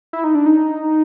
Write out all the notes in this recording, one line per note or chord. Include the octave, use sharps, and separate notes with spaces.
E4
D#4
D4
D#4